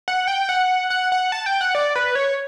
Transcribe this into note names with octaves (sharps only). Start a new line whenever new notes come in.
F#5
G5
F#5
F#5
F#5
A5
G5
F#5
D5
B4
C#5